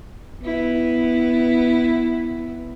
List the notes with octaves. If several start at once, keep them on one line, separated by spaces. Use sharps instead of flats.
B3 E4